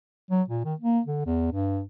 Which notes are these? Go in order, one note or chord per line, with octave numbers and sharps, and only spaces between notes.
F#3
A#2
D#3
A#3
D3
E2
G2